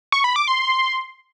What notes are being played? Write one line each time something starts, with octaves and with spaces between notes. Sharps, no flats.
C#6
B5
D6
C6